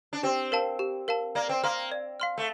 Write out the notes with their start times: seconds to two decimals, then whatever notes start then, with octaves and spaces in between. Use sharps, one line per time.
0.13 D4
0.23 C4 G4
0.52 A#4 F5 A5
0.79 G4
1.08 A#4 F5 A5
1.35 A#3 D5
1.49 C4
1.63 A#3 F5 C6 F6
1.92 D5
2.20 F5 C6 F6
2.38 A3